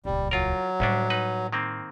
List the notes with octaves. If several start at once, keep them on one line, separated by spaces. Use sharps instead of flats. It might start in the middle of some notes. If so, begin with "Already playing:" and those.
D#1 C#2 G3
F#3 F4 A#4
D2 A2 G3 C#4 D4
D#4 B4
D#3 A#3 C4